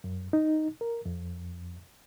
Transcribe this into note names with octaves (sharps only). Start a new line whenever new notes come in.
F#2
D#4
A#4
F2